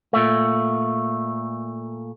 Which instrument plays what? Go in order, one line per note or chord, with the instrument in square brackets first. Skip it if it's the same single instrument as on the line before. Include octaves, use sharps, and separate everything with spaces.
[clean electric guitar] A#2 A3